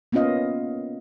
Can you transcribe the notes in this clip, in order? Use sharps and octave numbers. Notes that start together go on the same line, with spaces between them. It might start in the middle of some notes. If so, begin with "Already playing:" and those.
A#3 B3 C#4 F4 D#5 F5